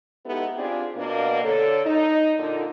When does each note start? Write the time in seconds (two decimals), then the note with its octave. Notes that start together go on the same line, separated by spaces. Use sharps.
0.25 G#3 B3 D#4 E4 G4 A4
0.56 C4 D4 F4 G4 G#4
0.96 B2 A#3 D4
1.42 D3 A4 C#5
1.85 D#4
2.38 A#2 D3